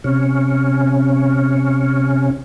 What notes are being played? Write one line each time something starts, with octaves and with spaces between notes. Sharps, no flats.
C3 C#4